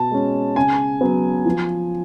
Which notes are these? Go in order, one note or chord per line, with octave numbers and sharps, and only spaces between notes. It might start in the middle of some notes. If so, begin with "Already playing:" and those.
Already playing: B2 A5
G#3 C#4
C#3 G#5
F#3 B3
F3